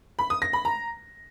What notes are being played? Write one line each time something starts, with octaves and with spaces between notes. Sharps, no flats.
B5
D#6
A#6
B5
A#5